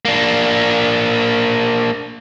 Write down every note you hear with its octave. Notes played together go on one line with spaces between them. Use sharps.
A#3 D4